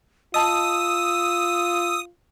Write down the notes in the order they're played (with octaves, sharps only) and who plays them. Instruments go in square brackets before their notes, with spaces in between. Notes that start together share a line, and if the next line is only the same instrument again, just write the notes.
[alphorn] F4 [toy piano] D#5 A5 [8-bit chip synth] D#6 [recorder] E6